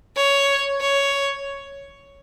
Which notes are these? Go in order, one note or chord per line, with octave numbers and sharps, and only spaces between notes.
C#5
C#5